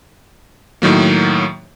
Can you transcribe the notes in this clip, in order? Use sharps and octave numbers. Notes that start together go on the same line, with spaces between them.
A2 D#3 F#3 A#3